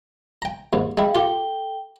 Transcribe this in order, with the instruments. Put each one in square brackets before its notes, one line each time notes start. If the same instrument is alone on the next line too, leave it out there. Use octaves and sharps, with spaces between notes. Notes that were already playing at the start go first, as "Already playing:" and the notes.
[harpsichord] G5 A#5
D#2 G#2
[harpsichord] G#3 E4 [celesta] G#4 F5 G5
[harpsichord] F4 G4 [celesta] A4 G5 G7